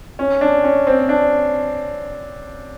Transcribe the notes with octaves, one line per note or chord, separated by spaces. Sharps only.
C#4
D4
C#4
C4
D4